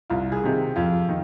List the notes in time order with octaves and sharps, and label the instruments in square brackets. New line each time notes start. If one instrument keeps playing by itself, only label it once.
[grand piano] C2 [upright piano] F4
[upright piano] G#4
[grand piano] C3 D#3
[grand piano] F2 [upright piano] F4
[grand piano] D#3